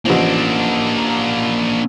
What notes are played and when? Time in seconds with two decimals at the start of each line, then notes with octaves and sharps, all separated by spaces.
0.05 A1 F3 A#3 D4